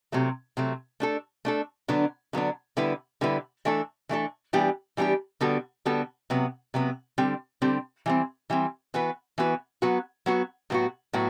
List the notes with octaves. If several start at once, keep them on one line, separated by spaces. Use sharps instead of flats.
C3 F#3 A3
C3 F#3 A3
A3 D4 A4
A3 D4 A4
D3 F#3 B3 D4
D3 F#3 B3 D4
D3 G3 B3 E4 B4
D3 G3 B3 E4 B4
E3 A3 D4 A4
E3 A3 D4 A4
E3 G3 B3 D4 G4
E3 G3 B3 D4 G4
D3 G3 B3 F#4 A4
D3 G3 B3 F#4 A4
C3 F#3 B3
C3 F#3 B3
D3 G3 C4 G4
D3 G3 C4 G4
E3 G3 C4
E3 G3 C4
E3 B3 F#4 B4
E3 B3 F#4 B4
F#3 B3 F#4
F#3 B3 F#4
A2 F#3 B3 F#4
A2 F#3 B3 F#4